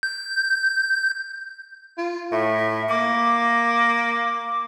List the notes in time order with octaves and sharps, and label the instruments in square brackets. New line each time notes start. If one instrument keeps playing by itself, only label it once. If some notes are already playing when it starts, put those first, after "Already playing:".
[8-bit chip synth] G6
[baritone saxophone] F4
[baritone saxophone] A2 [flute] E5
[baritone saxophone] A#3 [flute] D6